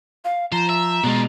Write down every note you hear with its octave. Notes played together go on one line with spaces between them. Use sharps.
F5
F3 C5 A#5
E5
B2 G#3 D4 F4